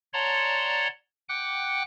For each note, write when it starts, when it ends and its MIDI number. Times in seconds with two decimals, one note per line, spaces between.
0.13 0.88 73
0.13 0.88 74
0.13 0.88 78
0.13 0.88 81
0.13 0.88 82
0.13 0.88 84
1.29 1.83 78
1.29 1.83 79
1.29 1.83 86
1.29 1.83 90